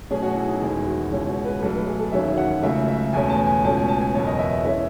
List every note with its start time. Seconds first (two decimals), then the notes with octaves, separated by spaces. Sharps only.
0.10 B1 B2 A3 C#4 G#4
0.22 F#4
0.35 E4
0.48 D#4
0.60 E1 E2 D#3 G#3 E4
0.86 F#4
1.11 C#2 B2 G#3 C#4 E4
1.28 F#4
1.45 B4
1.61 B1 A2 F#3 A4
1.75 B4
1.87 G#4
1.99 A4
2.12 E1 D#2 D#3 F#3 C#4 E5
2.37 F#5
2.62 C#2 C#3 F#3 A3 E5
2.88 E5
3.13 E2 B2 A3 C#4 G#5
3.29 A5
3.46 G#5
3.64 C#2 B2 A3 C#4 A5
3.77 G#5
3.88 A5
4.01 G#5
4.14 F#1 E2 B2 C#5
4.27 D#5
4.39 E5
4.65 E3 G#3 C#4 E5